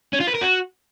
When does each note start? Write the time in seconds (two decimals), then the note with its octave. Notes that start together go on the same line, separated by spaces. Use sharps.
0.13 C#4
0.20 F4
0.27 B4
0.35 A#4
0.42 F#4